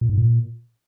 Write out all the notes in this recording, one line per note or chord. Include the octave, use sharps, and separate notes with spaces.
A#2
G#2
A#2